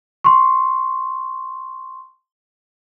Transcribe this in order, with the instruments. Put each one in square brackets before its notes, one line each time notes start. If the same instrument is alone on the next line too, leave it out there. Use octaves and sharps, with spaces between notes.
[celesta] C6 C#6